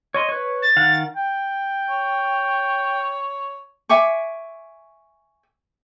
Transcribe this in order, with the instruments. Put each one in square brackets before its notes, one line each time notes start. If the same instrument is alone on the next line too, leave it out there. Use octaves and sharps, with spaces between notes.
[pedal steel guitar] C#5 D#5 C6
B4 C#5
[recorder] A6
[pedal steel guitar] D#3 F5 F#5
[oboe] G5
[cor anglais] C#5
[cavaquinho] E5 G#5 C#6 D6